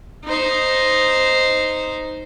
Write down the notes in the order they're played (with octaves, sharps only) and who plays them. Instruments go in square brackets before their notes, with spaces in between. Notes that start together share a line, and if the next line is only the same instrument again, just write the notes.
[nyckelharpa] D#4 C5